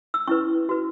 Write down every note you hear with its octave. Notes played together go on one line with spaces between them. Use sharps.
E6
C#4 E4 B4 C#6
F#4 B4